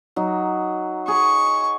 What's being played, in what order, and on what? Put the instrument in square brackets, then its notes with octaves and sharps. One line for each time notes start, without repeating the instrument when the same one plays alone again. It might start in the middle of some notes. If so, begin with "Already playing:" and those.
[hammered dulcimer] F#3 D#4
[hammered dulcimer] G#4 [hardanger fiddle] C#6